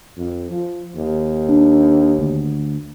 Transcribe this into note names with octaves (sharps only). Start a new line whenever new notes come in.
F2
F3
D#2
D4
D2